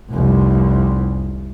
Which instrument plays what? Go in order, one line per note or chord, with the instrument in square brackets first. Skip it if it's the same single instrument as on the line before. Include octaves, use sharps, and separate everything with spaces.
[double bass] F1 C2